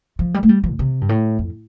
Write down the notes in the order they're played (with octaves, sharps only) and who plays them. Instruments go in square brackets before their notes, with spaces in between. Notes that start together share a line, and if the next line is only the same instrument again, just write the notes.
[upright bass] F3
G3
A3
G3
F3
A2
C3
G2
A2
F2